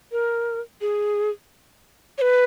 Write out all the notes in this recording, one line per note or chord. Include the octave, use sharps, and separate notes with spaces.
A#4
G#4
C#5
B4